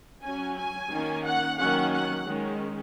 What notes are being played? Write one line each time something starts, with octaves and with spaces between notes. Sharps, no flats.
F#3 C#4 G#5
G#5
D#3 A#3 C#4
F#5
D#3 F#3 A#3 C#4 F#5
F#5
D#3 G#3 C#4